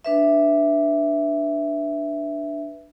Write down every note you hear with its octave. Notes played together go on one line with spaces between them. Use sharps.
D4 B4 E5